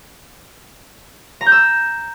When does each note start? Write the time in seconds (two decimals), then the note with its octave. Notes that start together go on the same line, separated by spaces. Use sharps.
1.41 A#5
1.46 G6
1.52 E6